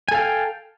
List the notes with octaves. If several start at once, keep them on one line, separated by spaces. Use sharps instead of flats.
A4 F5 G5 G#5